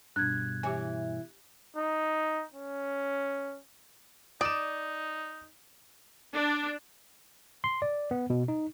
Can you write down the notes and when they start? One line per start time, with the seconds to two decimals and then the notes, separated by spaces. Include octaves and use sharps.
0.16 G2 B2 D4 F#6 G#6
0.63 E3 G4 C#5 G#5
1.77 D#4
2.54 C#4
4.41 D#4 D5 D#6 E7
6.33 D4
7.64 C6
7.82 D5
8.11 B3
8.30 B2
8.48 D#4